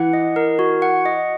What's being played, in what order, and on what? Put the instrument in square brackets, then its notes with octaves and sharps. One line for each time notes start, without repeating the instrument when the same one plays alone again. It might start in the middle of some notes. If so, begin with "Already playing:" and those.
Already playing: [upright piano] E3 [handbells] F#5
[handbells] D#5
A#4
F#4
F#5
D#5